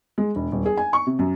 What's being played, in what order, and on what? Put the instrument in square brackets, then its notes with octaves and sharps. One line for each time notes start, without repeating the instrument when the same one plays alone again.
[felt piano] G#3
E1
D#1
G#4
G#5
C#6
C3
F#2